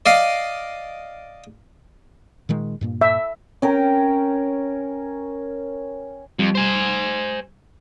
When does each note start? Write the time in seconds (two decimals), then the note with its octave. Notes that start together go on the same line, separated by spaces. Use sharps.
0.06 D5 D#5 F5
2.49 A#2 D#3 G#3
2.81 G2 A#2 A#3
3.01 E5
3.62 C#4 A#4 G5
6.39 F2 G3
6.55 C5 G#5